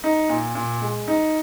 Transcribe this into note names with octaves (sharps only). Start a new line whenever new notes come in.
D#4
A#2
A#2
G#3
D#4